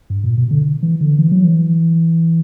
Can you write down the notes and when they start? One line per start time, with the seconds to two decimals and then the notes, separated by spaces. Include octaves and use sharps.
0.10 G2
0.24 A#2
0.38 B2
0.51 D3
0.83 E3
1.01 D3
1.18 E3
1.32 F#3
1.44 E3